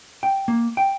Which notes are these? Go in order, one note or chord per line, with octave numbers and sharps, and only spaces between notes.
G5
A#3
G5